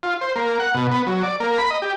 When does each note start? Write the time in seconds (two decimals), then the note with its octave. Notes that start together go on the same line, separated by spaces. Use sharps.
0.03 F4
0.21 C5
0.36 A#3
0.60 F#5
0.74 B2
0.91 B3
1.07 F#3
1.23 D5
1.40 A#3
1.58 B5
1.70 D#5
1.82 G4